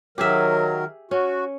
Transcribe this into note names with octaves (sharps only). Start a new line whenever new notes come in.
D#3 F#3 G4 G#4 A#4 E5
C#4 F#4